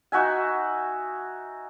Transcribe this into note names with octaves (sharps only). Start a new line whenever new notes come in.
D#4 F#4 E5 G#5